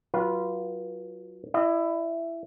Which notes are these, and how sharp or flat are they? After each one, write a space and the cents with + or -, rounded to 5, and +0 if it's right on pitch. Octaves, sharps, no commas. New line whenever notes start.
F#3 +0 F4 -20 B4 -30
E4 +15 D#5 -35